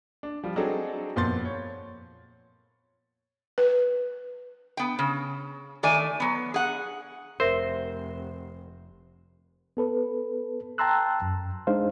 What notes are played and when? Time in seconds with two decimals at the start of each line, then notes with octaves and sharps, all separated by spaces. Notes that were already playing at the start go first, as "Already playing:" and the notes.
0.23 D4
0.43 F3 G3
0.56 F#3 C4 D4 D#4 G#4 A4
1.16 F2 A#2 B3 C6 G6 A6
1.45 C#5
3.58 B4
4.77 B3 G5
4.99 C#3
5.83 D#3 A3 D5 G#5
6.20 F#3 B3
6.54 G#4 F#5
7.40 F1 A#4 C5 E5
9.77 B3 A4 B4
10.78 G5 A5 A#5 C6 E6 F#6
11.22 F#2
11.67 G#3 D4 D#4 C5 F5